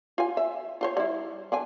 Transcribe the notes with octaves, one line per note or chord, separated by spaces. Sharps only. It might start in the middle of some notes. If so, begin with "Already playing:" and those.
F4 G#5
E5
F4 C5 C#5
G3 E4
D3 D4 G#5